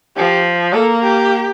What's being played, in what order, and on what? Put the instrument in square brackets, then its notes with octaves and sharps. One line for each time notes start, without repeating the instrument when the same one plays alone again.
[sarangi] F3 [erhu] G4
[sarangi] A#3 [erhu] A4
[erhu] G4